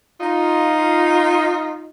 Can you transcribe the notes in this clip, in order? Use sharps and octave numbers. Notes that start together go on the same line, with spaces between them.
D#4 F4